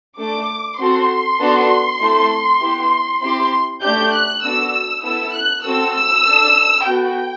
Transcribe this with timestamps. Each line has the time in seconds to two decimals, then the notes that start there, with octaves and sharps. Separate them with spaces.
0.18 A3 D4 A4 D6
0.78 C4 F#4 A4 C6
1.39 B3 D4 F#4 A4
2.00 A3 C4 E4 A4
2.61 B3 E4 G4
3.21 C4 E4 G4 C6
3.82 A3 D4 G4 G6
4.13 F#6
4.43 B3 D4 F#4 A4 E6
5.03 B3 E4 A4 E6
5.34 F#6
5.64 C4 F#4 A4 E6
5.95 E6
6.25 D4 A4
6.86 B3 F#4 A4 G5